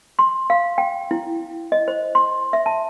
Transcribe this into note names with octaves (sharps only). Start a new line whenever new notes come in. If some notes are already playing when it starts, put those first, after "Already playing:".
C6
F5
G5
E4
D#5
C5
C6
E5
A5